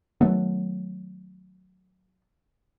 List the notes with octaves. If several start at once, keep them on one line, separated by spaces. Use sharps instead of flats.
D#3 F#3 A3 B3